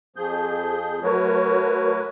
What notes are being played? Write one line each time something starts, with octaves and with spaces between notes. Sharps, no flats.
F2 F3 G#4 G6
F#3 A3 F#4 A#4 B4 C#5